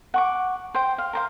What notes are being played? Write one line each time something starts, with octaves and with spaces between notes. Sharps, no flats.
F#5 C#6 D6
C5 G5
F5
A#4 C5 F5